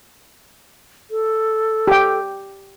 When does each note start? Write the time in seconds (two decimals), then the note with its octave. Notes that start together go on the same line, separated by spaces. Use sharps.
1.11 A4
1.87 G4 G5